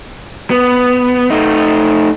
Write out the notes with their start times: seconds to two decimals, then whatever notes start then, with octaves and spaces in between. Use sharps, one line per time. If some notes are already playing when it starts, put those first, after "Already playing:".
0.51 B3
1.30 A3 D#4